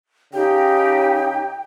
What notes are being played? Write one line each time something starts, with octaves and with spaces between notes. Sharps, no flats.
C#3 D#4 G4 G5